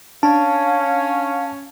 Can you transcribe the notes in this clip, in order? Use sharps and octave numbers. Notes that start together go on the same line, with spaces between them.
C#4 D4 F5 A5